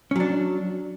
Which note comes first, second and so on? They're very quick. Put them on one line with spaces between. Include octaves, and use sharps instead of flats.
C#4 F#3 D4